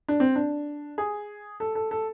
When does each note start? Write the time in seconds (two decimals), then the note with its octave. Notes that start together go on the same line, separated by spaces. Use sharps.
0.08 D4
0.20 C4
0.36 D4
0.98 G#4
1.60 A4
1.75 A4
1.91 A4